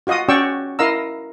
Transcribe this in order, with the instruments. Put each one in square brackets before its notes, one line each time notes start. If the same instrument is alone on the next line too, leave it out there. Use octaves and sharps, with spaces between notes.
[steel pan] F4 F#4 D#5 F5 D#6
C#4 F#4 D5 G5 C#6 E6
E4 A#4 D#5 F5 A#5 E6